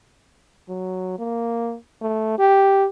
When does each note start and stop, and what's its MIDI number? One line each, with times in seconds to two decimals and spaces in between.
0.69 1.14 54
1.19 1.76 58
2.02 2.39 57
2.39 2.87 67